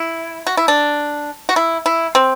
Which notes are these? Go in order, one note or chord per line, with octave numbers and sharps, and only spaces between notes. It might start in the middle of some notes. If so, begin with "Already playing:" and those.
Already playing: E4
F#4
E4
D4
F#4
E4
E4
C4